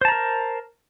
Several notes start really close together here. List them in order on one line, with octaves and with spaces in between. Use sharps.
C5 A5 A#5 A#4